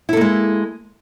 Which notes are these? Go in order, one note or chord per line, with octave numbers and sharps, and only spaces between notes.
G#3 A#3 E4 A4